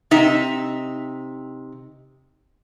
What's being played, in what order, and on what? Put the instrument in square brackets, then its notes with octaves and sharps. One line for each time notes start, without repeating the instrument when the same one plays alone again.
[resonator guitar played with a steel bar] C3 D#4 E5